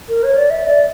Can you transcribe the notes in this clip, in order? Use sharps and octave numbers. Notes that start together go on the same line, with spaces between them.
A#4
C#5
D5
E5
D5